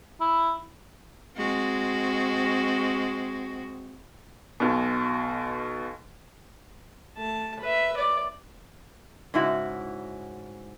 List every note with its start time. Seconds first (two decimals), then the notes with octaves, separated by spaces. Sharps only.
0.21 E4
1.38 G#3 C4 F#4
4.60 B1 B2
7.17 A3 A5
7.60 B4 E5
7.97 D5
9.34 G#2 C#3 E4 F#4